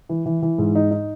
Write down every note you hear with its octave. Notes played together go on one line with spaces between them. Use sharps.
E3
E3
E3
G#2
D#4
D#4